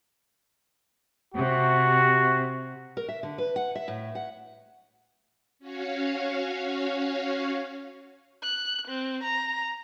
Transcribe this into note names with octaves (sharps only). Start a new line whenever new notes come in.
C3 F#4
A#4
E5
D3
B4
F#5
E5
A2
F#5
C#4 F#4 C#5 F5
F#6
C4
A#5